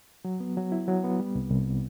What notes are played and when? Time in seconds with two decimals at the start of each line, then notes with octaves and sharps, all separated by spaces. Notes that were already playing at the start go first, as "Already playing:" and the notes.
0.25 F#3
0.40 B3
0.57 F#3
0.72 E4
0.88 F#3
1.04 B3
1.20 G3
1.35 C2
1.50 C2